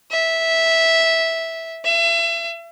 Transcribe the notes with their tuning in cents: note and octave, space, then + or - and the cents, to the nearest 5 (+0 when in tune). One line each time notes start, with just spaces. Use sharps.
E5 -10
E5 +35